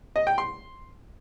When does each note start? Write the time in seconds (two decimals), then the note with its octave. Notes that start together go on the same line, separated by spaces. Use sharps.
0.16 D#5
0.27 G5
0.38 C6